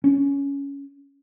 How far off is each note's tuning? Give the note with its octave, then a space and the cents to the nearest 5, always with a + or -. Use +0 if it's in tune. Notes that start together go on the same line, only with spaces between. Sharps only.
C#4 +10